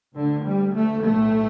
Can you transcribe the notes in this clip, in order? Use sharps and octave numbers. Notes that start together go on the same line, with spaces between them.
D2 D3
G3
A3
B1 A2 A3